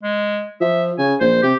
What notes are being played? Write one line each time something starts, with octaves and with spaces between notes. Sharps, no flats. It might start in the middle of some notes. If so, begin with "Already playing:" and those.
G#3
F3 E5
C#3 G#5
A#1 C5
C3 G4